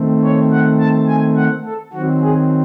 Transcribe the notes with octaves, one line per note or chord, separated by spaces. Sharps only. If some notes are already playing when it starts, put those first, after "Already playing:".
Already playing: D#3 A3 C4
C#5
F#5
A5
G#5
F#5
A4
D#3 F#3 C4 F#4
G#4